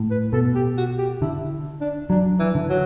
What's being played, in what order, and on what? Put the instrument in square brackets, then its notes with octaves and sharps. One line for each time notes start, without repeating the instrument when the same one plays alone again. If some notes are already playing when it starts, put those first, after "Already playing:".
Already playing: [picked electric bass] A2
[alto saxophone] B4
[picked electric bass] B2 [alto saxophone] A4
[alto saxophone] G4
F#4
G4
[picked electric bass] D3 [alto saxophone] E4
[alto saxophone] D4
[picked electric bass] F#3 [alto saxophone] D4
[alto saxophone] E3
[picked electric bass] D3
[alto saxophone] F#3